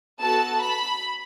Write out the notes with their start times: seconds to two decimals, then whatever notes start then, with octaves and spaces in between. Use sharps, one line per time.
0.20 B3 F#4 A4 A5
0.60 B5